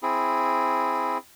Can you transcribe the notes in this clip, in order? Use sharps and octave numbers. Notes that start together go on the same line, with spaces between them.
C4 E4 G#4